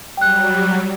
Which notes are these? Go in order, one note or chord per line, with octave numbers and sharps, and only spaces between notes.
F#3 G3 G5 F#6